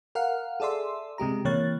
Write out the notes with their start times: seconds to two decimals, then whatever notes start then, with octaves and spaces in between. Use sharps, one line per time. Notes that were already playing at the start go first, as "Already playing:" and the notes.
0.15 A#4 F5 F#5
0.60 G#4 A4 D5 E5 C6
1.18 C3 G#3 G4 A#5
1.45 C3 E3 A#3 C#5 F#6 A6